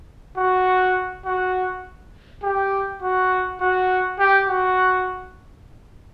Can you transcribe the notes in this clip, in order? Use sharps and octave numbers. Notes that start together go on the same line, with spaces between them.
F#4
F#4
G4
F#4
F#4
G4
F#4